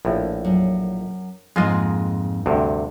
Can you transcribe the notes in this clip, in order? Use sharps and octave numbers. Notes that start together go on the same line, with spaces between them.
A#1 A2
F#2
F2 G#2 G#3 A#3 F4 D#5
D2 G2 C3